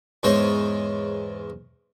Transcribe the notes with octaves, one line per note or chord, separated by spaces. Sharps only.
E2 G#2 C5 C#5 D#5